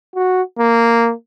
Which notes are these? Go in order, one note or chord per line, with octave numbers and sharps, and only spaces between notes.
F#4
A#3